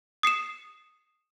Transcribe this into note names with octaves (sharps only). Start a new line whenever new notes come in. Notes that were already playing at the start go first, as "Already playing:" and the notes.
D#6 C7 C#7 E7